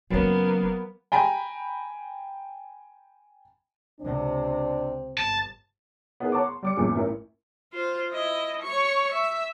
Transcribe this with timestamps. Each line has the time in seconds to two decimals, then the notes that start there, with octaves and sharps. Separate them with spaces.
0.10 F#1 F#3 A#3 B3 C#4
1.12 G5 G#5 A#5 B5
4.01 C#2 C3 C4 D4
5.18 G1 A5
6.20 B3 D#4 E4 G#4 A#4
6.32 C#5 F#5 A5 A#5 C#6 D6
6.46 C6
6.63 G3 D6 C#7
6.77 A1 E2 G2 A#2 G#4 D6
6.96 A1 E4 A#4
7.73 F4 C5
8.12 E4 D#5
8.62 C#5 C#6
9.12 E5